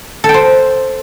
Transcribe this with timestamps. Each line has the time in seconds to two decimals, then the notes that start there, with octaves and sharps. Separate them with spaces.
0.24 A4
0.29 G5
0.34 C5